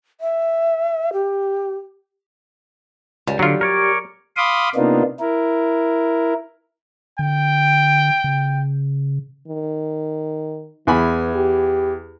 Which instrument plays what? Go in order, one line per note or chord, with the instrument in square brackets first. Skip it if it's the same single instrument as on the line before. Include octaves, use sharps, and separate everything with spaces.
[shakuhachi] E5
G4
[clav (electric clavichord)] C#2 [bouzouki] G3
[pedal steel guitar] D3 [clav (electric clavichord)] F#3 F4
[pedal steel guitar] A#4 C#5 D5
[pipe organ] F5 B5 C6 D6 D#6
C3 A#3 B3 D4 D#4 F4
E4 A#4
[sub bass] D3 [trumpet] G5
[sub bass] C#3
[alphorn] D#3
[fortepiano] E2 G#5 B5 [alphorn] E3
[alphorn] G4